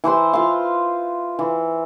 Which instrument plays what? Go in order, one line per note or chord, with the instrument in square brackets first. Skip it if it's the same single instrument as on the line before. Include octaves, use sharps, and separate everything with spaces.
[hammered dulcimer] E3 B4 C5 C6
F4 F5
E3